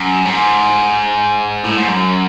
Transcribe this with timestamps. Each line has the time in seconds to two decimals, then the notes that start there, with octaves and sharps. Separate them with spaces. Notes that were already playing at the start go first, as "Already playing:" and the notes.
Already playing: F#2
0.25 G#2
1.65 A2
1.78 G#2
1.89 F#2